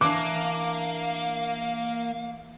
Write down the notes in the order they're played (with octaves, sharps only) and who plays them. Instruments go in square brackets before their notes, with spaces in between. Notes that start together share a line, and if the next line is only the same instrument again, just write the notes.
[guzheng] E3 D4 [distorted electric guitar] A#3 [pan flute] F5 [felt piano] D6